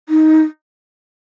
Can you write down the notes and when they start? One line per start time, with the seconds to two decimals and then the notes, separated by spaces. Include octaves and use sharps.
0.09 D#4